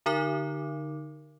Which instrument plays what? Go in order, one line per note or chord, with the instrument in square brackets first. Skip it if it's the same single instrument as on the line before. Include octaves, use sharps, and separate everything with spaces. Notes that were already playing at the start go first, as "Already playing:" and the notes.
[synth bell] D3 D#4 A#4 D6